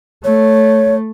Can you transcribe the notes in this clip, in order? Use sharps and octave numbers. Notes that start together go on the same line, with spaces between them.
A3 C#5